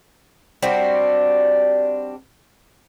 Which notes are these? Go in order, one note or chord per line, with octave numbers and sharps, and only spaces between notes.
G3 C4 D4 F#4